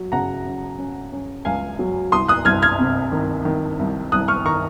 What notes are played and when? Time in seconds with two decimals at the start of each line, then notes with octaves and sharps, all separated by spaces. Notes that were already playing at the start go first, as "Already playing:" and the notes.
Already playing: F#3
0.12 C#3 F#5 A#5
0.46 C#4
0.79 C#4
1.12 C#4
1.45 C#2 F5 G#5
1.79 F#3
2.12 C2 C6 D#6
2.28 D#6 F#6
2.45 C2 F6 G#6
2.62 F6 G#6
2.79 C3
3.12 D#3
3.45 D#3
3.79 C2
4.12 C2 D#6 F#6
4.28 C#6 F6
4.45 D#3 A#5 C#6